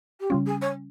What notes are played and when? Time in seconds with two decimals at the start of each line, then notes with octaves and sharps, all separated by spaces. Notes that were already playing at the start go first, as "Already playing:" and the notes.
0.20 G4
0.30 C#3 G3 C#4 F4
0.46 G#4
0.61 C#5